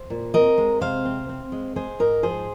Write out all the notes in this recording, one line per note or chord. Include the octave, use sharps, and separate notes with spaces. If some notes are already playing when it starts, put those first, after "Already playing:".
Already playing: C5
A#2
C4 A#4 D#5
G#3
C3 C5 F5
C4
C4
G#3
G#3 G#4 C5
G#2 A#4 D#5
F3 G#4 C5